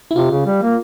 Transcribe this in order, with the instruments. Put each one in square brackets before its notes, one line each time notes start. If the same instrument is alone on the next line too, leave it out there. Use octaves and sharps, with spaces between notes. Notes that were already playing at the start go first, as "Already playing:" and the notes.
[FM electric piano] E4
[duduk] C3 [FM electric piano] F4
[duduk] C#3
G3
A#3